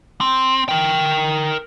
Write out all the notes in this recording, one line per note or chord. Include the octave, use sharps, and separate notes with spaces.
C4
A#4 G5